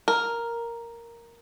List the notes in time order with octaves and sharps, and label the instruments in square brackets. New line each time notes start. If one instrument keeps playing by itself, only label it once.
[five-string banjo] A#4